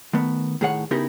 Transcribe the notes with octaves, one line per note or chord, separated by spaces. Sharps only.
D#3 A3 B3
A2 D#3 G#4 C#5 F#5
C#3 B3 D#4 E4 G4 A#4